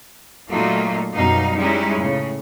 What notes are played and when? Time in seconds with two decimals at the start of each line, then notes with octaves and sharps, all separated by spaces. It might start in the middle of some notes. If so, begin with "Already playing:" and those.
0.50 A#2 F#3 A3 A#3 D#4 F4
1.14 F#2 B2 G3 D#4 F5
1.56 G3 G#3 C#4 D#4 E4
1.95 A2 C#3